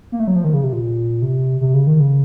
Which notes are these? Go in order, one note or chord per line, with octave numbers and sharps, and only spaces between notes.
A#3
A3
F#3
F3
D#3
C#3
C3
A#2
C3
C3
C#3
D#3
C#3